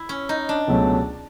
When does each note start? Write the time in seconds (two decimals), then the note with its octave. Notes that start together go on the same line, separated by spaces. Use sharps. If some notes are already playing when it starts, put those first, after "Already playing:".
Already playing: E4
0.09 C#4
0.29 D#4
0.49 D4
0.68 C#2 B2 F#3 A3